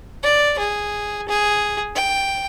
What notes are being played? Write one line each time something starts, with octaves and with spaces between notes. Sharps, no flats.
D5
G#4
G#4
G5